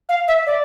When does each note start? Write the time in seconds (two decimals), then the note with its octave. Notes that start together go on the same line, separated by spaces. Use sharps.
0.09 F5
0.28 E5
0.47 D5